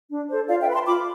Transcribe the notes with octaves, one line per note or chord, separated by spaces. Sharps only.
D4
A4 C5
F4 D5 F5
E5 G5
B4 B5
A5 C6
F4 B5 D6